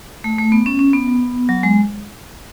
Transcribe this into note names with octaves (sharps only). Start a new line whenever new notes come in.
A3
A3
B3
C#4
C#4
B3
F#3
G#3